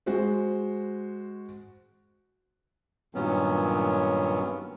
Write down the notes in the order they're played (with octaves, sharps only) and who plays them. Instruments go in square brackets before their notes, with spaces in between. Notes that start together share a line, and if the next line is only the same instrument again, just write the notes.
[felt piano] G#3 F#4 C5
[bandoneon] G2 A#2 D#3 F#3 B3 C#4